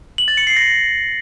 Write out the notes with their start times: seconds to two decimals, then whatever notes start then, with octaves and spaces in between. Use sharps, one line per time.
0.18 F#7
0.28 A6
0.37 C#7
0.47 C7
0.57 A#6